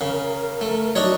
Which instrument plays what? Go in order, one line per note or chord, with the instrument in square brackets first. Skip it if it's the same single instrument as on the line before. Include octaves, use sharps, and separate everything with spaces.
[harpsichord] C#3 [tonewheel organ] A#4
[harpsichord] A3
[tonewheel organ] F#3 [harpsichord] D4 D#4 C#5